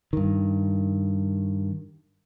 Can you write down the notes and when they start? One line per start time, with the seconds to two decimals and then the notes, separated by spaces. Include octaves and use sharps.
0.13 G2 D#3